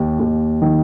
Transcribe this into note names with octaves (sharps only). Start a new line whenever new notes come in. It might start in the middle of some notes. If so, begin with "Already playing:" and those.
Already playing: D#2
D#2
D#3